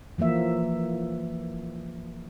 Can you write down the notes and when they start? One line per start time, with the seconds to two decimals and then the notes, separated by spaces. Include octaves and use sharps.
0.18 E3 F3 A#3 E5